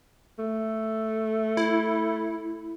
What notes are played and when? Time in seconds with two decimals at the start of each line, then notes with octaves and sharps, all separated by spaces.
0.39 A3
1.57 E4